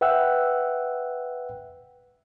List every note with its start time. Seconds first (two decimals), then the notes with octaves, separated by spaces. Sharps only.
0.01 B4 E5 F#5 G5 E6 F#6